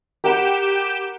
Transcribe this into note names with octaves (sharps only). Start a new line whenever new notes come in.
G4 A#4 F#5 G5 B5 E7